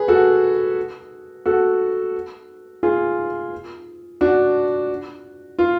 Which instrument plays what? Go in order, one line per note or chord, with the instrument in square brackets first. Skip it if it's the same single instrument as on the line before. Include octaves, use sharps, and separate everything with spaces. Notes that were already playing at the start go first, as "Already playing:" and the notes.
Already playing: [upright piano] G#4 B4
F#4 A4
F#4 A4
F4 G#4
D4 F#4
F4